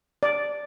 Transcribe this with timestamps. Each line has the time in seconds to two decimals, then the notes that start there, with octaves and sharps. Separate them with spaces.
0.23 D5